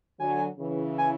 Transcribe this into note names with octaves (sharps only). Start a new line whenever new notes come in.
D3 F#3 G#5
C#3 E3
G#5